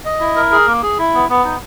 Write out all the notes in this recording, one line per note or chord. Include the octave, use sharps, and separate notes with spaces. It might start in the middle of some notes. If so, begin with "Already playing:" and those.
D#5
E4
A#4
G#4
A#3
G#4
E4
B3
B3
D#4